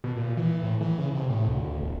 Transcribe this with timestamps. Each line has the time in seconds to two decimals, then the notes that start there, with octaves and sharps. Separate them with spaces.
0.04 B2
0.16 A#2
0.37 E3
0.63 A2
0.81 E3
0.98 C#3
1.15 C3
1.29 A2
1.48 D2
1.81 E1